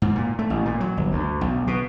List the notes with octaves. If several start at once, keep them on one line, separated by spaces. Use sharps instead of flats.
G#2
A#2
A3
A1
A#2
F#3
G1
D2
B1
B2